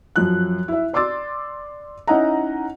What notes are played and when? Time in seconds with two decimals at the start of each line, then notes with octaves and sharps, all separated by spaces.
0.16 F#2 F3 F#6
0.68 E4 E5
0.93 D5 C6 D6 E6 A6
2.07 C#4 D#4 E4 D#5 F#5 A#5